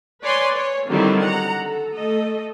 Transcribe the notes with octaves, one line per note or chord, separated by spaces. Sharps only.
B4 C#5 D5 G#5 C6
C#5
D3 D#3 F#3 G3 C4 E4
F#5 A#5
A4
A3 A4 D#5